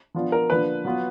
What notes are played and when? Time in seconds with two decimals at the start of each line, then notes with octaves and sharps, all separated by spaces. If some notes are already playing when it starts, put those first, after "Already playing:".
0.15 F3 B3 D4 F4
0.32 A#4
0.50 D3 F3 A#3 D4 B4
0.85 F#3 B3 F4